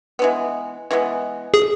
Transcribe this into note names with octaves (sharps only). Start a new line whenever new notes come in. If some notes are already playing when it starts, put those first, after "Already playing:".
E3 G#3 B3
E3 G#3 B3
G#4